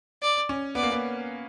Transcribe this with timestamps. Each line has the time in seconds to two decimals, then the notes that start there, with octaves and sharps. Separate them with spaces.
0.22 D5
0.49 C#4
0.75 B3 D5
0.83 A#3
0.92 B3